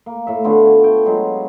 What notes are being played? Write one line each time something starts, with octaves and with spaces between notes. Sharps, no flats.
A#3
A2 E5
D3 A3 B3 F4
C#5
A3 G5
F#3 G#3 F4